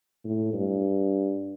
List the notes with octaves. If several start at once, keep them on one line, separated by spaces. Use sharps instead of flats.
A2
G2